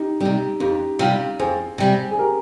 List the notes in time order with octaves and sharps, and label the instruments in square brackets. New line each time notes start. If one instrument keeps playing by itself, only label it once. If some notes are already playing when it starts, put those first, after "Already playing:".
Already playing: [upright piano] D#4 G4
[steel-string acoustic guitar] C3 G3 [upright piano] D#4 G4
[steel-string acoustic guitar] F2 [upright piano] D#4 G4
[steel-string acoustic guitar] C3 G3 [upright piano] F4
[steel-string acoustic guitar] F2 [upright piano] G#4 C5
[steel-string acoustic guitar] C3 G3
[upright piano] G#4
G4 A#4